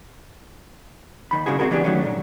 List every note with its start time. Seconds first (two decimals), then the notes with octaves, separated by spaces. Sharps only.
1.31 D#2 D#3 B5
1.46 B1 G2 C#3 E4 F#4 G#4
1.59 C4 D#4 F#4 G#4 A#4
1.71 E3 B3 D4 G4 G#4
1.84 D#3 F#3 A3 C#4
2.02 G2 A#2